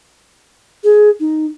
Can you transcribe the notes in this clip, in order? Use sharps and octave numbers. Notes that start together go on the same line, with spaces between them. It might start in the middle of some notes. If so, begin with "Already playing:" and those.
G#4
D#4